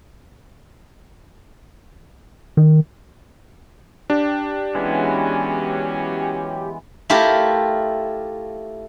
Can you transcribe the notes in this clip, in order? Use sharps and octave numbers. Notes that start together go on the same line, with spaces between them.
D#3
D4 G4
E2 E3 F#3 G#3 B3 C#4
A3 E4 F4 G4 A#4